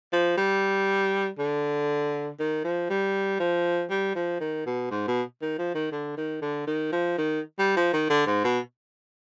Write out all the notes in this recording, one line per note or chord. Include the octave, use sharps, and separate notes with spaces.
F3
G3
D3
D#3
F3
G3
F3
G3
F3
D#3
B2
G#2
B2
D#3
F3
D#3
D3
D#3
D3
D#3
F3
D#3
G3
F3
D#3
D3
G#2
B2